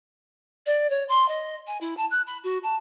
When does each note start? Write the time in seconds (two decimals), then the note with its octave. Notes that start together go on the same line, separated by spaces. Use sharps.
0.66 D5
0.90 C#5
1.08 C6
1.28 D#5
1.67 G#5
1.80 E4
1.97 A5
2.10 F#6
2.26 B5
2.43 F#4
2.63 A5